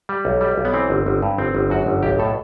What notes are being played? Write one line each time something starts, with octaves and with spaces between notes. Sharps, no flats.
G3
B1
G3
B1
B3
E3 C4
G1
G1
G2
G1 C4
G1
F#2 F#4
G1
B1 G4
A2 A4